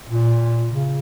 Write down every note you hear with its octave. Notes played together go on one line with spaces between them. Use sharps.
A#2
C#3